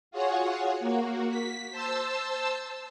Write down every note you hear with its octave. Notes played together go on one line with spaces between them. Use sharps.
F4 F#4 G#4 C#5 F#5
A#3 F#4
B6
C5 A5 E6